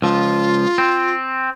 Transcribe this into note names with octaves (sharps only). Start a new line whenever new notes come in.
C#2 F3 F4
C4